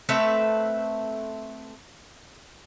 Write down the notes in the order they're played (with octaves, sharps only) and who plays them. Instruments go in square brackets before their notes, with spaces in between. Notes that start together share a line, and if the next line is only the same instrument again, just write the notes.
[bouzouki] A3 C4 B4 E5